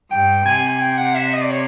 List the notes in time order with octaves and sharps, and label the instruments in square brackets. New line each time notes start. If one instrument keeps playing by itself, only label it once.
[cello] G2 [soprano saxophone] G5
[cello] C3 [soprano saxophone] G#5
[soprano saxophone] G5
F#5
E5
D#5
D5
C#5